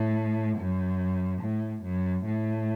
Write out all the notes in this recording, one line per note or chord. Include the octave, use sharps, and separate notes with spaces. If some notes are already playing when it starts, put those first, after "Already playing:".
Already playing: A2
F#2
A2
F#2
A2